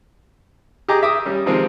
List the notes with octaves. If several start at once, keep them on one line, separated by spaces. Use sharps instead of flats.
G4 G#4 D#5 A#5 D6
E5 D6 D#6
G3 C#4
C3 D#3 F3 G#3 C4